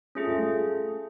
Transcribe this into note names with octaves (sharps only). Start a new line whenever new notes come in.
A3 C#4 F4 G#4
A3
A3